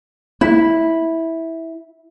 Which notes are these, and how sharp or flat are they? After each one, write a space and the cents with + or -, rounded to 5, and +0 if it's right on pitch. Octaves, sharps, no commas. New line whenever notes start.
E4 -10